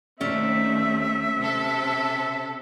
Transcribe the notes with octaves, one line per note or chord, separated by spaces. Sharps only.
D#2 A3 C4 C#4 D5 E5
C3 A4